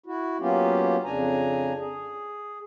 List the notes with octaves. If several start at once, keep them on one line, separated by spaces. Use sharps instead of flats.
E4 F#4
F#3 A#3 B3 C#4 F4 G4
F2 C#3 D4 G#5 A#5
G#4